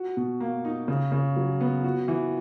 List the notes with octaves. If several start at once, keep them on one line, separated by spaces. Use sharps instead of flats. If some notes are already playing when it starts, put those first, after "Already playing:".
Already playing: F#4
B2
A#3
D#4
C#3
C#3
F#3
B3
F#4
E3